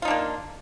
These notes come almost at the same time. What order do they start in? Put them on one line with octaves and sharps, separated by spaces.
F4 D#4 D4 A#3